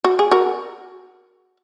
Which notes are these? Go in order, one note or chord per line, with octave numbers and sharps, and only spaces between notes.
F#4
G#4
F#4 A#4